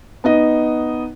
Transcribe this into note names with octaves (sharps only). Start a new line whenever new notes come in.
B3 D#4 D#5